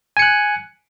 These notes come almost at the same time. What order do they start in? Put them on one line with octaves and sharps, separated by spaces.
G#5 C#7 F#6